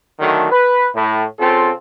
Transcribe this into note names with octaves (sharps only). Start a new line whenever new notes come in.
D3 D#3 F#3 A3
B4
A2
C#3 C4 F4 A4